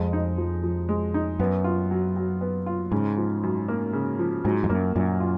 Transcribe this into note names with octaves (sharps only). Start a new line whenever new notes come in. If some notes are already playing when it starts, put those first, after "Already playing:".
Already playing: F2 G#3
D#4
F3
F3
G#3
D#4
F#2 B3
F4
F#3
F#3
B3
F4
G#2 C#3
F3
F#2
A#3
C#3
F3
G#2 F#3
F2
F#2 A#3
F#2 A#2
F4